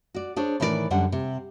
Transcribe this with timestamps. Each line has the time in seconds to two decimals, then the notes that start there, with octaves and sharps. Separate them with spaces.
0.14 F#4 D5
0.36 D4 G#4 C5 C#5
0.60 A2 D#3 E3 G4 D5
0.91 F#2 D3 G3 F#5
1.12 C3